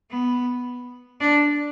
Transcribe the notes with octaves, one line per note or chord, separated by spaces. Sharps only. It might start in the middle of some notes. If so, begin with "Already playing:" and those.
B3
D4